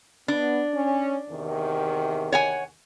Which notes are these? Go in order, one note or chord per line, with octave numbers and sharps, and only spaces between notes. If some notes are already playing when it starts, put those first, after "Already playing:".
B3 D4
C#4
E2 C3 D#3
C#5 F#5 G#5